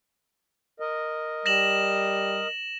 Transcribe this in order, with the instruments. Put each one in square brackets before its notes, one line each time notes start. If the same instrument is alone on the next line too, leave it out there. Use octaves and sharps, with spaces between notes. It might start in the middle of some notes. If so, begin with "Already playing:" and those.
[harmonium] A#4 D#5
[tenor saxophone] G3 [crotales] A#6 E7 F#7